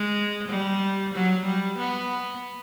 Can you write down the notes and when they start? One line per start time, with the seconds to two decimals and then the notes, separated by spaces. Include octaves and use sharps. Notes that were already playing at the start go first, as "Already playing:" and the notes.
Already playing: G#3
0.48 G3
1.14 F#3
1.46 G3
1.79 B3